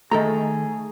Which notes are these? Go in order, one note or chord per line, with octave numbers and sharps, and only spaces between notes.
D#3 A3 G#4 A4 A#5